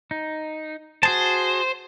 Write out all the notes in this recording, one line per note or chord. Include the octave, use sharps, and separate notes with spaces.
D#4
F#4 G#4 C5 A5